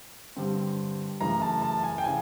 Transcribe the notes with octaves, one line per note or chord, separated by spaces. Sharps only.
G2 D3 G3 C4
F#2 C#3 E3 A3 A#5
A5
A5
G#5
G5
C#3 E3 G#5